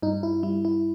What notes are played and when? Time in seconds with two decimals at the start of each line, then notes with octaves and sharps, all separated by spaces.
0.02 G2 D#4
0.23 E4
0.43 G3 E4
0.65 E4